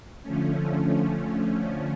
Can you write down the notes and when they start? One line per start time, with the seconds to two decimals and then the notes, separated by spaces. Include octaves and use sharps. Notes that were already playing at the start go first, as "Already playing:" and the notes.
0.23 D3 F3 A3 C#4